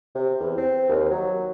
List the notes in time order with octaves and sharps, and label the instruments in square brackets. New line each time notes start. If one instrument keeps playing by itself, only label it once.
[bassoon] C3
E2
C4
D#2
F#3